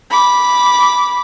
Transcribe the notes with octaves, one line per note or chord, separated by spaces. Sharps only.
B5 D6